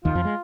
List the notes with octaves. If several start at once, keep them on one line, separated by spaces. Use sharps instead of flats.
D#2 D#3 F4
F2 F3
G#3